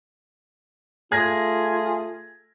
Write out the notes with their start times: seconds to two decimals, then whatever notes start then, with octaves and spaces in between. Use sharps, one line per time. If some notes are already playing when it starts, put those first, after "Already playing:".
1.12 A3 F4 G#4 G#6 A#6